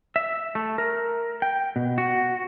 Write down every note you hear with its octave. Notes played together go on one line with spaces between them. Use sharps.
E5
A3
A#4
G5
B2
F#4